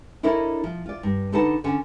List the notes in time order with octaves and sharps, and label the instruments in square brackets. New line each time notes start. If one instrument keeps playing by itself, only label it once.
[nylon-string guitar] D4 E4 A4 A#4 C#5 D#5
F3
F4 D5
G2
D3 D#4 A4 B4 F#5 A5
D3 C#4 F#5